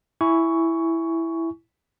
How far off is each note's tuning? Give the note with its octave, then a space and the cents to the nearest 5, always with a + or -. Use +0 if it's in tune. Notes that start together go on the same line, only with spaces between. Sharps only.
E4 +0 G#5 +0 C#6 +10